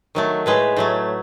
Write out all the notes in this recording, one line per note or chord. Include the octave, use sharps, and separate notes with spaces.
D#3 F#3 A3
A2 G#3 B4
A2 F#3 A3